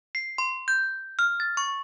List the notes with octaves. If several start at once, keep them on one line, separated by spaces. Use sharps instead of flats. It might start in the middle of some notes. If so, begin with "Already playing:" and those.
C7
C6
G6
F6
A6
C#6